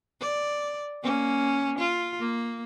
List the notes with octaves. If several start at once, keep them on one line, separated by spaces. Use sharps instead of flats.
D5
A#3 C#4
F4
A#3